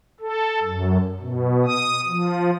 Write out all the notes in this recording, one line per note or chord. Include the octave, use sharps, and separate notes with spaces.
A4
F#2
B2
D#6
F3